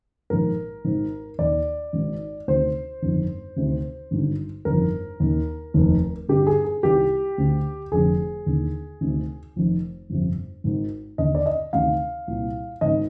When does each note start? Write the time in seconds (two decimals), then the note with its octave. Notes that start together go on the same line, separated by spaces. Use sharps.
0.30 A#1 G#2 D#3 A#4
0.84 G#1 G#2 D#3
1.39 D#2 D#3 D5
1.93 G#1 G#2 D#3
2.48 D2 C3 D#3 C5
3.02 G1 F2 D#3
3.56 D2 C3 D#3
4.11 G#1 G2 D3
4.65 G1 F2 D#3 A#4
5.20 D#2 D#3
5.74 F1 D#2 D#3
6.29 G1 G2 D3 G4
6.47 G#4
6.65 G#4
6.83 C2 C3 D#3 G4
7.38 D2 D3
7.92 F1 F2 D3 G#4
8.46 D#2 D3
9.01 D2 C3 D#3
9.56 F1 F2 D#3
10.10 G1 F2 C3
10.64 G#1 G#2 D#3
11.18 D#2 D3 D#5
11.35 D5
11.46 D#5
11.73 D2 C3 D#3 F5
12.27 C2 A#2
12.81 G#1 G#2 D#3 D#5